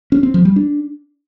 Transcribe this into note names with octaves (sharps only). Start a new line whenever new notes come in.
C#4
C4
F3
G3
D4